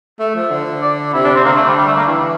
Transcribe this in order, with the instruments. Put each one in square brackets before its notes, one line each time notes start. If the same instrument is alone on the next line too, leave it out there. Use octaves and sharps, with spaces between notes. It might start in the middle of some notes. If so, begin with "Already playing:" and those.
[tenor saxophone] A3 [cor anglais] E5
[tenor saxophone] F3
D3
[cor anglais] D5
[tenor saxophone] C3 [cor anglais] E4
[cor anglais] D4
C4
[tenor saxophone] D3 [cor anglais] A#3
[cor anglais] A3
G3
G3
A3
A#3
[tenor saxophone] E3 [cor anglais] A3
[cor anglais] G3